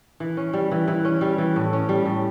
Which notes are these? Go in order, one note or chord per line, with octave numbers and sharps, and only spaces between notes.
E3
C#4
G3
E3
E3
C#4
G3
E3
A2
C#4
G3
A2